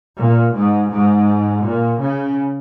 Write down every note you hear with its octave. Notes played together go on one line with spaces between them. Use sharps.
A#2
G#2
G#2
A#2
C#3